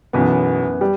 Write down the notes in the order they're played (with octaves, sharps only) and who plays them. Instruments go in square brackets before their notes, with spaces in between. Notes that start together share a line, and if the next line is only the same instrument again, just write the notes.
[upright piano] B1 B2 [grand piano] F#2 E3 B3
[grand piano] G3